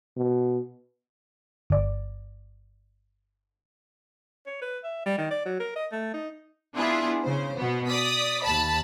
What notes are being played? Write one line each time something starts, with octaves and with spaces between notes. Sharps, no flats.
B2
G1 D5
C#5
B4
E5
G3
D#3
D5
F#3
A#4
D#5
A3
D#4
B3 D4 E4 F4 G#4
C#3 C5
B2 B3
D5 D#6 B6
D#2 A5 B5